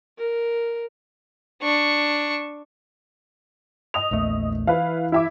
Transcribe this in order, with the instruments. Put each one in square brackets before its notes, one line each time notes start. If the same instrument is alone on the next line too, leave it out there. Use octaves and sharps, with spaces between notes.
[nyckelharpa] A#4
[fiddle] D4 C#6
[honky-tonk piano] D#5 D#6 F7
[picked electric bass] A#1 E2 A3
[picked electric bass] E3 [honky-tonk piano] E4 B4 F5
[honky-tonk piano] E4 E5 D6